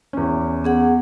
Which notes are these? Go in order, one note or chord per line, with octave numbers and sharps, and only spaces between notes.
E2 C#4
B3 G#4 F#5